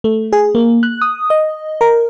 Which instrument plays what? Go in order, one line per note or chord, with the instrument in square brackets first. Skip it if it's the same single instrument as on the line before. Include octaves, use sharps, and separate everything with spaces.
[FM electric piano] A3
G#4
A#3
F#6
D#6
D#5
A#4